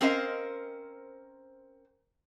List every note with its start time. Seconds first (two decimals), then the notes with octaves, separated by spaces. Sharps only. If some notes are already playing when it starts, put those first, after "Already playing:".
0.01 C4 C#4 A#4 C5 D#5 F5